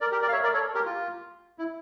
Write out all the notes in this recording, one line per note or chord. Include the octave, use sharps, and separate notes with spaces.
A#4 D5
G4 A#4
A#4 D5
F5
C#5 E5
A#4 D5
A4 C#5
G4 A#4
F4
E4